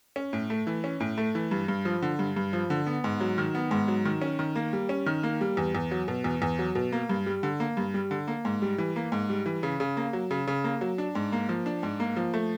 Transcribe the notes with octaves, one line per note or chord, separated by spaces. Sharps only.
C#4
A2
A3
E3
C#4
A2
A3
E3
G2
G2
F3
D3
G2
G2
F3
D3
B3
G#2
F#3
D#3
B3
G#2
F#3
D#3
C#4
D#3
A#3
G3
C#4
D#3
A#3
G3
E2
E2
F#3
B2
E2
E2
F#3
B2
A#3
G2
G3
D3
A#3
G2
G3
D3
A#3
G#2
G3
E3
A#3
G#2
G3
E3
C#3
C#3
A#3
F#3
C#3
C#3
A#3
F#3
D4
G#2
A#3
F3
D4
G#2
A#3
F3
A3